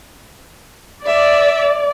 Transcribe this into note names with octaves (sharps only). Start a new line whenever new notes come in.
D5 E5